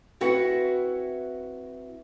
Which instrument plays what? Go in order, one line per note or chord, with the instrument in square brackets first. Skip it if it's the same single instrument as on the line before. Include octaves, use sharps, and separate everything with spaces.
[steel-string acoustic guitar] C4 E4 F#4 B4 E5 F#5